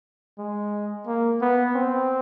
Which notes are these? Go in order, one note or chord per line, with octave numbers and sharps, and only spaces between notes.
G#3
A#3
B3
C4